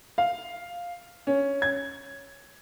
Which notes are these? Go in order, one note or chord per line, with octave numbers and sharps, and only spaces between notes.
F5
C#4
G#6